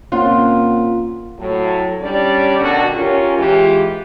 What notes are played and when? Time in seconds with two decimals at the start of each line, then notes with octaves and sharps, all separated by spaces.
0.12 A#2 C4 C#4 F4 F#5
1.39 A2 F#3
2.01 G3 C#4 D4 D5
2.59 B2 D3 D#3 F#4
2.95 C#4 F4 G4 A#4
3.37 E3 G#3 F4 G4